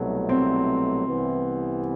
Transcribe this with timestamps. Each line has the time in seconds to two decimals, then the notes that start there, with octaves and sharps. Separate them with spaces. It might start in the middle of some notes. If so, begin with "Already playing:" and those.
Already playing: C2 B2 F#3 A3
0.29 C4
1.06 C2 C3 E3 B3